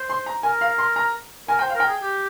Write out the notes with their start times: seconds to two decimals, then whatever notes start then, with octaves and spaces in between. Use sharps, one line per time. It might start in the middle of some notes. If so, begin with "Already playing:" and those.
Already playing: C5
0.10 C6
0.26 A#5
0.43 A#4 G#5
0.61 F5
0.78 C6
0.96 A#5
1.48 A#4 G#5
1.59 C5 G5
1.70 F5
1.75 A#4
1.80 G5
1.88 G#4
2.02 G4